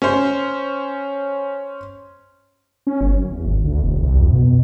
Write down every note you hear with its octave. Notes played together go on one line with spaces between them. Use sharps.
C#4 C5
C#4
G1
F#2
E2
G#1
D2
E1
C2
F2
B2
B2